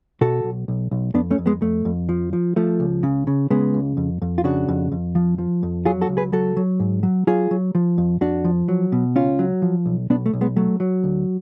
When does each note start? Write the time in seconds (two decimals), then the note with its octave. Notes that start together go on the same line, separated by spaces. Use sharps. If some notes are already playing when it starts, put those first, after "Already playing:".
0.21 B2 F#4 A4
0.44 B1
0.68 B1
0.91 B1
1.14 F2 B3 D4
1.31 A3 C#4
1.38 F2
1.46 G#3 B3
1.62 F2 A3
1.85 F2
2.09 F3
2.33 F3
2.56 F3 A3
2.80 C#2
3.03 C#3
3.27 C#3
3.51 C#3 G#3 B3
3.74 C#2
3.97 F2
4.22 F2
4.38 F4
4.44 C#3 D4 F#4
4.68 F2
4.92 F2
5.15 F3
5.38 F3
5.63 F2
5.85 F#3 F4 G#4
6.01 F#4 A4
6.09 C#2
6.17 G#4 B4
6.32 F#3 F#4 A4
6.57 F#3
6.80 G#2
7.03 F#3
7.27 F#3 F4 G#4
7.51 F#3
7.75 F3
7.98 F2
8.21 F2 D4 F#4
8.45 F3
8.68 F#3
8.92 B2
9.16 C#2 C#4 F4
9.39 F#3
9.62 F3
9.86 B1
10.10 B1 B3 D4
10.26 A3
10.33 B1
10.41 G#3 B3
10.56 F#3 A3
10.80 F#3
11.04 D2